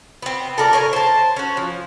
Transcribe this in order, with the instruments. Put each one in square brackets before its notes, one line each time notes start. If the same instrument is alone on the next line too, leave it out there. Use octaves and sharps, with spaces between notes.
[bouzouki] B3 C4
A4 A#4 D5
A#4 C#5 G#5
C5 A5
C#4 F#4
F3